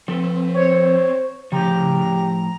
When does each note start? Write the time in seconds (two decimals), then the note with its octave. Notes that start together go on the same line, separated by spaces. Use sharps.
0.08 F3 C4 A4 B4
0.54 C5 C#5
1.52 A2 C#3 F3 G4 A#5